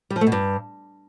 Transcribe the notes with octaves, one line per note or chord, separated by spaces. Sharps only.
G3
F3
A3
B2
G2